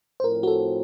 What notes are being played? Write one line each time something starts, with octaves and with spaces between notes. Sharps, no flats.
C5
A2 F3 C4 A#4
F#4
A4